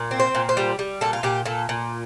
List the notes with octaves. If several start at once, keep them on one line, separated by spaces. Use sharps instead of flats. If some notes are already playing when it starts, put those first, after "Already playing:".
Already playing: A#2
C4
C5
A#2
C5
G3
G3
A#2 A4
F4
A#2 G4
A#2 A4
A#2